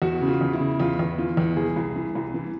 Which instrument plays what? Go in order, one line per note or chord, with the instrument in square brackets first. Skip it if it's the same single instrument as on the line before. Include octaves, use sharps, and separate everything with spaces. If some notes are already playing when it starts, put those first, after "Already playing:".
[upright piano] E2 F#4
C#3
F4
E2
E4
C#3
E2 F4
E2
E3 F4
E2
C2 G#4
C2
E3
C2
E3